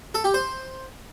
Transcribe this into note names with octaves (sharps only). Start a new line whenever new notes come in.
A4
G4
C5